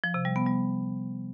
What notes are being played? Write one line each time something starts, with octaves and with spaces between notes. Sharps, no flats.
F3
C3
G3
B3
G3